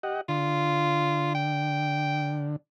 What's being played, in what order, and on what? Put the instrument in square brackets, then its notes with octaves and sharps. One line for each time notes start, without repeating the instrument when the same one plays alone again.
[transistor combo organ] G4 D#5 F#5
[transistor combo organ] D3 [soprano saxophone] F4
[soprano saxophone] G5